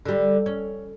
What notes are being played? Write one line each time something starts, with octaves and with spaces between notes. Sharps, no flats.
D3 G3
C#4